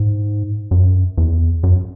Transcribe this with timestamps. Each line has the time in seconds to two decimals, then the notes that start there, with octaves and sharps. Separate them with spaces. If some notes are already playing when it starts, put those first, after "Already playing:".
Already playing: G#2
0.71 F#2
1.18 E2
1.63 F#2